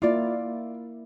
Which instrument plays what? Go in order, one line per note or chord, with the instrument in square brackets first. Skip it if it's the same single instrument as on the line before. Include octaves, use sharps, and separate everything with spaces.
[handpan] A#3 E4 [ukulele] F4 D5